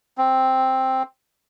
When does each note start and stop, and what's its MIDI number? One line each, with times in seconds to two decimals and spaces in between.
0.18 1.03 60